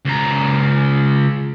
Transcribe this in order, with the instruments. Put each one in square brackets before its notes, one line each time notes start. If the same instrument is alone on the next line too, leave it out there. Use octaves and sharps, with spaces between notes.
[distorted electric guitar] C#2 A#5